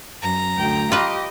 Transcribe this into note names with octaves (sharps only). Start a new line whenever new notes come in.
F#2 A#5
D2 G5
F4 G4 B4 D#5